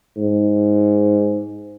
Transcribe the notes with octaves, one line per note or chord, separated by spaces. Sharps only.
G#2